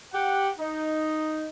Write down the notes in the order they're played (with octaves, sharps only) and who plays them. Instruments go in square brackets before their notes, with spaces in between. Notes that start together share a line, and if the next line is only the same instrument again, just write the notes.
[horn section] G4 F#5
D#4